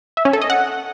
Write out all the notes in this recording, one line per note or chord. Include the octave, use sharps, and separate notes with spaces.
E5
C#4
A4
D#5
F#5